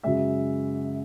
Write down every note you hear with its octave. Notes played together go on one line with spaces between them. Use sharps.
F#2 C#3 G#3 E5